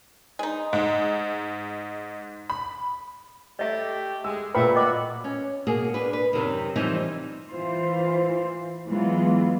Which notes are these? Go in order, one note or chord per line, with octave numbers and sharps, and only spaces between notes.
G#3 D#4
G#2
B5
A3 G4 D#5 E5
G#3 E6
A#2 A3 B4 E5 G5 B5
F#4 D#5 D6
C#4
B2 A#3 G#4
D4 B4
B4
F#2 C3 D#3
E3 F3 G3 C4 D#4
E3 F4 C5
E3 F#3 G#3 B3 F4